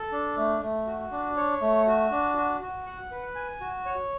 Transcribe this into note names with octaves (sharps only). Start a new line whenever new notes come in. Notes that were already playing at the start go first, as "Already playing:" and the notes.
Already playing: A4
D4
A3
A3
F#4
D4
C#5
A3
F#4
D4
F#4
F#4
F#5
B4
G#5
F#4
C#5